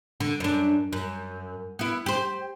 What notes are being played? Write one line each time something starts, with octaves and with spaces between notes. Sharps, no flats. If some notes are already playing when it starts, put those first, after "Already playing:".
D3
F#2 D4
F#2
B3 E4
G4 C5